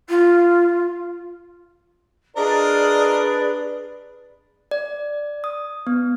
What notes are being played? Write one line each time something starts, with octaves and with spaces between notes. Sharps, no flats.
F4
D4 F4 G#4 A#4 B4 D5 D#5
D5
D#6
B3